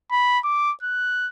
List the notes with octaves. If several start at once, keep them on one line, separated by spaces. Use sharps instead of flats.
B5
D6
F#6